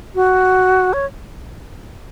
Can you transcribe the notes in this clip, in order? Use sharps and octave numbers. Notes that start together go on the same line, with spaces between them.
F#4
C#5